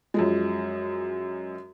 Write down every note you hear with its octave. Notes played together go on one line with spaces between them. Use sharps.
F#2 F3 G#3